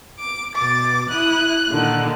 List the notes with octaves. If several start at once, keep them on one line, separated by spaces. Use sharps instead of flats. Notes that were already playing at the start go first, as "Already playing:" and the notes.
D6
B2 D6 A6
E4 D#6 F#6
A#2 D3 D#3